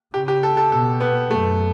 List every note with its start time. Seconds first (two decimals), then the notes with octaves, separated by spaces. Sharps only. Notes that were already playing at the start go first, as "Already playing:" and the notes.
0.14 C#3 G4
0.28 G4
0.43 A4
0.57 A4
0.72 B2 A4
1.00 B3
1.29 F#2 A3